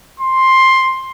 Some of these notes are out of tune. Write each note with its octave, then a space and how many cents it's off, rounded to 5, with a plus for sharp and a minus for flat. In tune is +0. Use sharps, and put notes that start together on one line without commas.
C6 +10